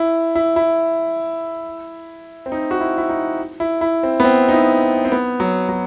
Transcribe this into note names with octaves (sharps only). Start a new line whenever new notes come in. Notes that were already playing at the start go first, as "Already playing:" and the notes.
Already playing: E4
E4
E4
C4
D#4
F#4
E4
E4
D#4
E4
E4
C4
B3
C4
D#4
E4
C4
B3
F#3
F#3